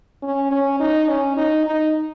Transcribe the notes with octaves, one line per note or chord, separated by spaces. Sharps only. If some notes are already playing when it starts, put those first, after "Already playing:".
C#4
C#4
D#4
C#4
D#4
D#4